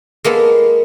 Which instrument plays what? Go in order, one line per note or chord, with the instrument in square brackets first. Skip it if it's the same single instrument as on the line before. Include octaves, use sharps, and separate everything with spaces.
[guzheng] G#3 A#3 B3 A4